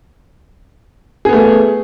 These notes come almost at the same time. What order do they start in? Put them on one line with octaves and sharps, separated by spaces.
G#4 B3 A3